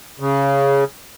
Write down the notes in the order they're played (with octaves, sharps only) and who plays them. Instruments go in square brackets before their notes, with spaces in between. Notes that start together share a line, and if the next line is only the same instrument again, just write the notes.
[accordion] C#3